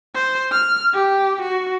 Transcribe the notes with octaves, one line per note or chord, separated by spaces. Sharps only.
C5
F6
G4
F#4